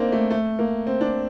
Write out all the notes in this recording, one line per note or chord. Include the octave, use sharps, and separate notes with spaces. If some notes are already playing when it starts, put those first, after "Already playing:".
Already playing: A#3 C4 D4 D#4
A3
A3
A#3
C4
D4